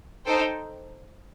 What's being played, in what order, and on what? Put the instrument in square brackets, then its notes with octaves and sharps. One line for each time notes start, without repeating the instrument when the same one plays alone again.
[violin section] D#4 A4 C5 G5